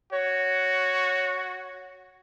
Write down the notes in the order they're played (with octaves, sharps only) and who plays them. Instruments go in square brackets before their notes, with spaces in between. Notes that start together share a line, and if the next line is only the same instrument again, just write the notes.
[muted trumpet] F#4 [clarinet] C#5